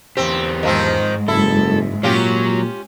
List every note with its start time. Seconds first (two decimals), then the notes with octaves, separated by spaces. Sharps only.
0.17 E2 G2 C4 G4
0.63 G#2 D#3 F3 G#3 C4
1.28 F#1 E4 A4
2.03 A#2 F#3 C#4 F4 G4